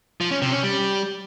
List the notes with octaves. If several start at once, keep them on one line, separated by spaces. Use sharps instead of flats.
F3
C#4
C3
C#4
G3